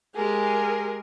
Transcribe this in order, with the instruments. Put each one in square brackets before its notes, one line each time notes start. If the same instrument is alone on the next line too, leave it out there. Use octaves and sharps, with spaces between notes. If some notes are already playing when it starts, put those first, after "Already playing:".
[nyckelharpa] G#3 G4 [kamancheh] G#4 A#4